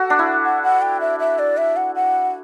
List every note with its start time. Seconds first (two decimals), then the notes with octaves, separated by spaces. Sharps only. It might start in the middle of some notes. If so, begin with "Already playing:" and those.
Already playing: F#4 A4 F#5
0.10 D4
0.19 E4
0.44 F#5
0.63 F#5
0.82 G5
1.00 E5
1.19 E5
1.39 D5
1.57 E5
1.77 F#5
1.95 F#5